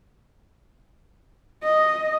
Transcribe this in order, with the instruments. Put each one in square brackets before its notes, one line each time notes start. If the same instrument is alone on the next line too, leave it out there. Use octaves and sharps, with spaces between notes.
[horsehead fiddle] D#5